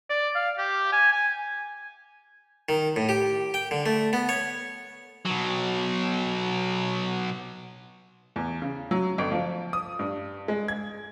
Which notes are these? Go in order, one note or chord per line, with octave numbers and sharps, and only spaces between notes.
D5
F5
G4
G#5
G#5
D#3
A2
G4
G5
D3
A3
B3
C#5
B2 F#3
E2
C#3
F#3
G1
F3
D#6
G2
G#3
G#6